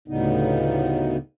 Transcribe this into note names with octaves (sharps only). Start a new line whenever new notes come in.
D2 A2 C#3 G3 B3 D#4